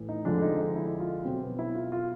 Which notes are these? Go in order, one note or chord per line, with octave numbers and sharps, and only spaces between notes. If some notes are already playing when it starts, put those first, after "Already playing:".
Already playing: A2 E3
D#4
F2 D3 F3 G#3 D4
D#4
D#4
E4
F4
B2 F#3 C4
B3
E4
F4
F4